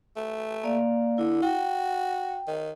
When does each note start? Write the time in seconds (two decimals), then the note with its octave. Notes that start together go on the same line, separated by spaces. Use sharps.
0.16 A3
0.64 A#3 D5 F5
1.18 D3 E4
1.42 F#4 G5
2.47 D#3